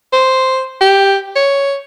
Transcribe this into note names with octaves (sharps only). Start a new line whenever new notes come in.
C5
G4
C#5